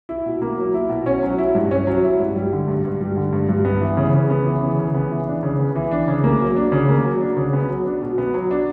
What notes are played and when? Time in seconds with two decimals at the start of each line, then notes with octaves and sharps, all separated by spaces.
0.09 E4
0.26 B2
0.42 A#3
0.58 F#3
0.74 E4
0.90 B2
1.06 C#4
1.23 F#3
1.38 E4
1.55 G2
1.71 C#4
1.87 F#3
2.04 E4
2.20 G2
2.36 G3
2.52 D3
2.68 G2
2.85 G2
3.01 G3
3.17 D3
3.33 G2
3.49 G2
3.65 B3
3.81 E3
3.97 C#3
4.14 C#3
4.30 B3
4.46 E3
4.62 C#3
4.79 C#3
4.95 B3
5.11 E3
5.27 D4
5.43 C#3
5.59 B3
5.76 E3
5.91 D4
6.08 C#3
6.24 A#3
6.41 F#3
6.56 D4
6.72 C#3
6.88 A#3
7.04 F#3
7.21 D4
7.37 C#3
7.53 B3
7.69 F#3
7.86 D4
8.02 B2
8.18 B3
8.34 F#3
8.51 D4